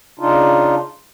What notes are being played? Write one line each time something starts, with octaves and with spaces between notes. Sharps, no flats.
C#3 D4 D#4 F4